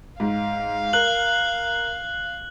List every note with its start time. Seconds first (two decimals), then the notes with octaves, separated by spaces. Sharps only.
0.20 G#2 F5
0.93 A#4 F#6 F#7